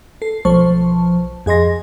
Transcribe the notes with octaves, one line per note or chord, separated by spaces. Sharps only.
A4 C7
B1 F3 C5 A5 C#6
F2 G#4 D#5 C6 A#6